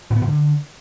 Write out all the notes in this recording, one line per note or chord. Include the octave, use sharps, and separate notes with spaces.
A2
B3
A2
D3